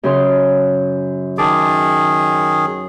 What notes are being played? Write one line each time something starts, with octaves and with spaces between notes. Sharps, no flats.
F#2 C#3 C6
D#3 G#4 A5 D6